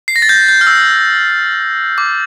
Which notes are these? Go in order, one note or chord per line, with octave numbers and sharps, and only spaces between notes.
C7
A#6
A6
G6
G6
F6
E6
D6